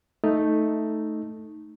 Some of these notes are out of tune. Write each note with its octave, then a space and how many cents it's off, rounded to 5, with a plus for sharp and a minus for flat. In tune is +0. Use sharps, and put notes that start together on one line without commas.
A3 +0 D#4 +0